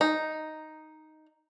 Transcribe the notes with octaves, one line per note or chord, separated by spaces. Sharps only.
D#4